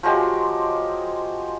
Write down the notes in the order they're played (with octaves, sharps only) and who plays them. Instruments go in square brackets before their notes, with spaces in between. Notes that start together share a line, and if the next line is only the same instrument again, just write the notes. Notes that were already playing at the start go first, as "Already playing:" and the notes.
[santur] F3 F#3 G#3 G4